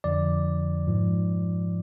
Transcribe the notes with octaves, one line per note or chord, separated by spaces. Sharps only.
F2 D3 F3 D5
G#2 F3